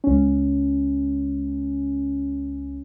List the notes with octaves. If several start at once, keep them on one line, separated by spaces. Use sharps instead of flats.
C#2 C#4